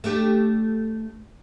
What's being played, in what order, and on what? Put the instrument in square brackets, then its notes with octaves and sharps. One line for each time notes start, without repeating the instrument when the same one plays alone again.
[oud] A3 D4 G4